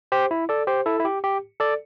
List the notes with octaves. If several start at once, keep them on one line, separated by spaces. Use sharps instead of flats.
G4 C5
E4
A4 D5
G4 C5
E4 A4
E4
G4
G4
A4 D5